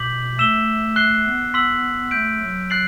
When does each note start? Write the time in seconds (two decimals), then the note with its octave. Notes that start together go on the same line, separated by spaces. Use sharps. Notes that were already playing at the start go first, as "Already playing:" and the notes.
Already playing: B2 D6 G6 B6 F#7
0.38 A3 E6 B6 E7 G7
0.96 F#6 C7 G7
1.25 B3
1.54 C6 E6 B6 F#7
2.11 A3 G6 B6 D7
2.40 F#3
2.70 F#6 A6 C7 F#7